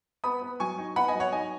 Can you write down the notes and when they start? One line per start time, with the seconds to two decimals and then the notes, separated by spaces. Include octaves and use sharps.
0.24 B3 B5 D#6
0.42 B3
0.60 F#3 G#5 C#6
0.78 D#4
0.96 B3 F#5 B5
1.08 D#5 G#5
1.14 F#3
1.20 C#5 F#5
1.32 D#4 D#5 G#5